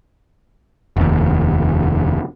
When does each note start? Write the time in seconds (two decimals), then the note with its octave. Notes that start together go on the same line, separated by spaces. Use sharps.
0.97 F1 D#2